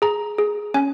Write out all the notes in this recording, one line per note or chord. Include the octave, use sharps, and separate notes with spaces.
G#4 A#5
G#4
C#4 G#5